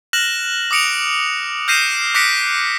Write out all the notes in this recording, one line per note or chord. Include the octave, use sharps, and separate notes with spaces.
F6 F#6 A#6 E7 F#7
D6 D#6 C#7 D7 F7
F6 G6 A#6 C7 D#7 E7
D6 F#6 A#6 B6 C#7 D7